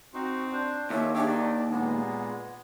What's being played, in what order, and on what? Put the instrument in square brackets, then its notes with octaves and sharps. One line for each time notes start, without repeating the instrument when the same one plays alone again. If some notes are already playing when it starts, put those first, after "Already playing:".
[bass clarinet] C4 [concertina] D#4 F#4
[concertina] D4 C5
[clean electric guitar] D#2 [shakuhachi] C#5 [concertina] E5
[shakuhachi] D4 [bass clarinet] G4 [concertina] G#4 C#5 E5
[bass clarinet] D#3 [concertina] D5
[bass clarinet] A#2 [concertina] G#3 B3 [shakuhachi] F#5